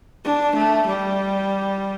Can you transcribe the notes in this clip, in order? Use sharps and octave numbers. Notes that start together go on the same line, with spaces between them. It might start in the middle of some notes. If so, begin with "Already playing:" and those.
D4
A3
G3